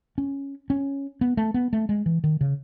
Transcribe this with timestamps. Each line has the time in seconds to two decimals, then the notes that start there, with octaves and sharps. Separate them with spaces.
0.18 C#4
0.70 C#4
1.21 B3
1.37 A3
1.54 B3
1.73 A3
1.89 G#3
2.06 E3
2.24 D#3
2.41 C#3